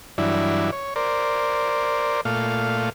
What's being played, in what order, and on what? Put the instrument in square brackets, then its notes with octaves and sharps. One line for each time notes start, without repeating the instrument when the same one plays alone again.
[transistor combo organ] G2 E3 F#3 D4 E4
C#5
A#4 C5 D5
A#2 A3 F5